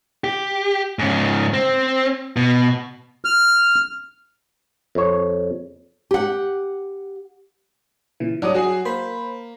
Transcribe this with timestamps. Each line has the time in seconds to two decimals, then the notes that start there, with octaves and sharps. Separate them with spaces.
0.24 G4
0.99 G#2 C#3
1.53 C4
2.36 B2
3.25 F6
4.95 F2 C#5
6.11 G4 F#5
8.20 A#2 C#3 E3
8.42 F#3 G3 D4 D6 D#6
8.55 F#3 F#4 G#4 C7
8.85 A#3 C5 B5